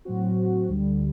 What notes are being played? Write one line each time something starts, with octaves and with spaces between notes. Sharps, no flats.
A2 F#3 C4 F#4
D2 D3 G3